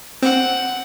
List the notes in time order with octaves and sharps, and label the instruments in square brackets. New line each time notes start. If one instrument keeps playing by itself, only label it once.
[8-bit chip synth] C4 [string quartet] F#5